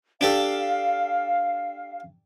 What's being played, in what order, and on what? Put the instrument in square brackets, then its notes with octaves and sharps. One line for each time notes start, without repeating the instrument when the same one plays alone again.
[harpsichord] D4 G4 A4 [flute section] F5